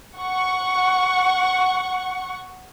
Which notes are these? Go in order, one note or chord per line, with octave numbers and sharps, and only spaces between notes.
F#5 C#6